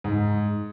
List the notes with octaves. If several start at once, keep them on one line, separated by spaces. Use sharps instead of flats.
G#2